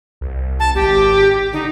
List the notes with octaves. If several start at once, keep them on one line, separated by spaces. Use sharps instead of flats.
C2
A5
G#1 G4
D3 D#4